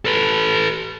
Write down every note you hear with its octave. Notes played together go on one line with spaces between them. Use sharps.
A4 B4